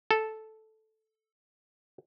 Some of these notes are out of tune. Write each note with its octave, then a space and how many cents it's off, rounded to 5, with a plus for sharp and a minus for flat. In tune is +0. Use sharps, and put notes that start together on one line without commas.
A4 -5